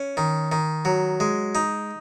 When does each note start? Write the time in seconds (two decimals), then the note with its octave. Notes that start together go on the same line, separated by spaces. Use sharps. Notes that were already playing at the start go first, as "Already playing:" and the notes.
Already playing: C#4
0.17 D#3
0.52 D#3
0.85 F#3
1.20 G#3
1.55 D#4